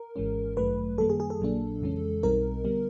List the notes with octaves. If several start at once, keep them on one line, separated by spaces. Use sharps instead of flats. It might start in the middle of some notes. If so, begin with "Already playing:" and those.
Already playing: A#4
G#1 G#2 E3 G#3 C#4
A1 G2 D#3 F#3 A3 B4
F#2 D#3 G3 A#3 A4
G#4
G#4
A4
A#1 A#2 F#3 A#3 D4
F2 C#3 E3 G#3 C#4
B1 B2 G3 C4 D#4 A#4
D3 G3 B3